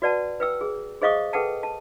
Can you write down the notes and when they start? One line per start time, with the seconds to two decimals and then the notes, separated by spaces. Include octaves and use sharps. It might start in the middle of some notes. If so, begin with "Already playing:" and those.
0.02 F#4 B4 D5 F#5 A5
0.40 B4 G5 E6
0.61 G#4
1.02 G#4 C5 D#5 F5 C#6 D#6
1.33 G#4 A4 B4 F#5 G5 A5
1.63 A5